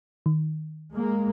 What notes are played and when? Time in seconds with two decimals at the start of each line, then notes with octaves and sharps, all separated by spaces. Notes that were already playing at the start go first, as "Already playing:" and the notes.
0.26 D#3
0.91 G#3 A#3